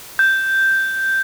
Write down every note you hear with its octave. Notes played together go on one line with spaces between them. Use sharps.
G6